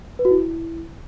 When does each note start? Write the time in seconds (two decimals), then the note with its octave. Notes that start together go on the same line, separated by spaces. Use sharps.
0.19 B4
0.25 F#4
0.31 E4